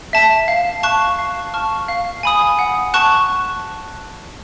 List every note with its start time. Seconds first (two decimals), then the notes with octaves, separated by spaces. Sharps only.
0.13 E5 A5
0.48 F5
0.83 A5 C#6 F#6
1.19 F5
1.54 A5 C#6 F6
1.88 F5
2.23 G#5 B5 D#6
2.59 F#5
2.94 A5 C#6 F#6